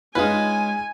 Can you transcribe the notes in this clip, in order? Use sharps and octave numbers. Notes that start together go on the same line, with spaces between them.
G#3 C#4 D#4 F4 B4 G#5